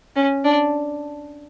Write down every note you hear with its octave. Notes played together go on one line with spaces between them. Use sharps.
C#4
D4